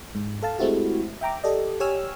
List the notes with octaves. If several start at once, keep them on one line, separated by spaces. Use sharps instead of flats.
G#2
A4 F5 A5
G#3 A3 C4 E4 F#4 G4
E5 G5 A#5 D6
G4 A4 D5 D#5
G4 C#5 G#5 E6 F6